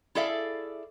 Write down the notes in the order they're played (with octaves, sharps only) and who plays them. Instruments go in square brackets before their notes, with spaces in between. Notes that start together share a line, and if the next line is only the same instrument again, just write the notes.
[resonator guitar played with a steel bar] E4 G#4 A4 D5 E5 F5